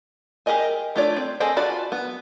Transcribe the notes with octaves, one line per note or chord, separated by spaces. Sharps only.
G4 G#4 A#4 D#5 G#5
A3 D4 F4 C#5 D5
C4
G#4 A4 C5 D#5 G5
F4 F#4 D5 A5 B5
B3